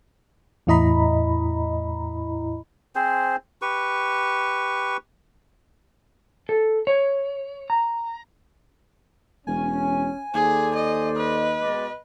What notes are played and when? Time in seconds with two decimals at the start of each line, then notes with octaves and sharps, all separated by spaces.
0.67 E2 A2 E4 D#5 A#5 B5
2.95 C4 G#4 C5
3.62 G4 B4 C#6
6.49 A4
6.87 C#5
7.70 A#5
9.47 E1 C#4 G#5
10.34 D#2 G#4 A4 C5 D5
10.75 D#5
11.16 B4 D#5
11.61 B2 G#3 D5